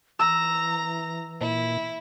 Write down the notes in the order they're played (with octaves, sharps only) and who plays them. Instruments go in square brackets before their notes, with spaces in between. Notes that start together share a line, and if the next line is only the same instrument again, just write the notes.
[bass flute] E3 [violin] A#5 [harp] E6
[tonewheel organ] A#2 [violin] E4